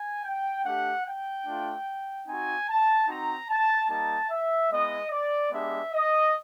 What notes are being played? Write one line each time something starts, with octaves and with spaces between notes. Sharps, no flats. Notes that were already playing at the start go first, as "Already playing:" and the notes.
Already playing: G#5
G5
A3 D4 G4 F#5
G5
A3 D4 F4
C4 D#4 F#4 G#5
A5
C4 D#4 F#4 A#5
A5
G3 A#3 D#4 A5
E5
G#3 B3 E4 D#5
D5
G#3 B3 D4 G4 E5
D#5